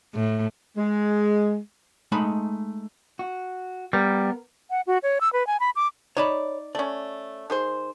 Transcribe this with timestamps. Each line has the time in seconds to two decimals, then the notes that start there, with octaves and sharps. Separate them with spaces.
0.14 A2
0.77 G#3
2.12 G#3 A3 D#4 B5
3.19 F#4
3.93 G3 B3 A#4
4.71 F#5
4.87 F#4
5.03 C#5
5.21 E6
5.33 B4
5.47 G#5
5.60 B5
5.76 D6
6.17 D#4 C#5 D5 A5 B5
6.75 A3 C#4 D5
7.50 D#3 G#4 C5